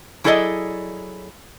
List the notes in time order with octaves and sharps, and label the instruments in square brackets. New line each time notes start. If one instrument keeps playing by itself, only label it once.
[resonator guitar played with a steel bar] F#3 E4 G#4 A4 D5 D#5